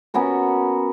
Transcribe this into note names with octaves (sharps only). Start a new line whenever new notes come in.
B3 C#4 F#4 A#4